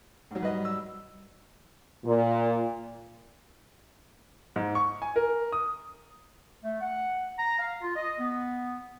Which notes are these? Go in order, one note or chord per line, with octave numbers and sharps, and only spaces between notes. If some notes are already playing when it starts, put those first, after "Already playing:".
G#2 F#3
G3 B4 D#5
E6
A#2
G#2
C#6
G#5
A#4
D#6
A3
F#5
A#5
F5
F4
D#5
B3